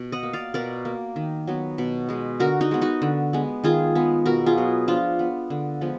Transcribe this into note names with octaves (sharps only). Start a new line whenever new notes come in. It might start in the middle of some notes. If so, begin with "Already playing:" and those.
Already playing: B2
D#5 F#5
A#3
D5 F5
B2 A#4 D5
A#3
D#3
F#3 B3
B2
G#3 B3
D3 F#4 A#4
D#4 F#4
G#3 B3
D#4 F#4
D3
G#3 B3
D#3 F4 G#4
G#3 B3
B2 F#4 A#4
F4 G#4
F#3 B3
F3 D4 F4
B3
D3
F3 G#3 B3